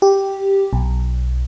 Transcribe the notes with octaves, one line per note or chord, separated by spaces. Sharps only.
G4
B1